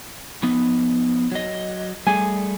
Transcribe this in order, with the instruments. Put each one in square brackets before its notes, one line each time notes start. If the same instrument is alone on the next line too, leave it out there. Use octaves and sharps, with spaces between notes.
[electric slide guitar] F3 B3 D#4
F#3 D#5
[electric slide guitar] G3 A3 G#4 [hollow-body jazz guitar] G#5